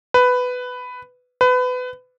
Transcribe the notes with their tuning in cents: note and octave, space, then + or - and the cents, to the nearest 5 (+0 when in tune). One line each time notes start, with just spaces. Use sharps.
B4 +10
B4 +25